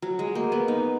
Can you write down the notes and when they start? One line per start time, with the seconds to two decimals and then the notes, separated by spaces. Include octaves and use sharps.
0.02 F#3
0.19 G#3
0.35 A#3
0.52 B3
0.68 D#4